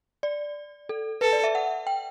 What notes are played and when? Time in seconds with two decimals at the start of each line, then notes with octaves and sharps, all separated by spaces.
0.23 D5
0.89 A4
1.21 A4 B4
1.33 D5
1.44 E5
1.55 F#5
1.87 G5